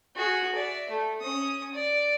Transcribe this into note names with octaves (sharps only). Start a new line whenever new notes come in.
F#4 G#4
D5 E5
A3
C#4 D#6
D5